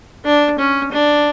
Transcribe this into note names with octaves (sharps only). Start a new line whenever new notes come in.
D4
C#4
D4